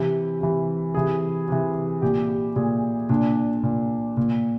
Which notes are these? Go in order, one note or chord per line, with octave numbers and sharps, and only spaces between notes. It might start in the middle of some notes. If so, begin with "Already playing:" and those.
Already playing: C3 E3
C3 E3
C3 E3 G#4
C3 E3
A#2 G4
G4
A#2 G#4
A#2 D4
A#2
A#2